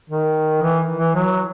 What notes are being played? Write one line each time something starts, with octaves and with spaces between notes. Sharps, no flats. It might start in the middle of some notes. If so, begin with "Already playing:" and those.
D#3
E3
E3
F#3